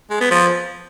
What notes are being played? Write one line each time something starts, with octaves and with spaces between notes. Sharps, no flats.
G#3
B3
F3